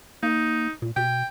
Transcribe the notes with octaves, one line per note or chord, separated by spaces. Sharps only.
A#3 D#4
A#2
B2 G5